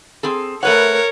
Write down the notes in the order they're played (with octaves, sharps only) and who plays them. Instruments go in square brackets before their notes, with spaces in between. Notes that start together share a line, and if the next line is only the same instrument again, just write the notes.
[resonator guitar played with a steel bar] C4 G#4 A4
[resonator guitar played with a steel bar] A3 B4 F#5 [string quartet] A#4 C#5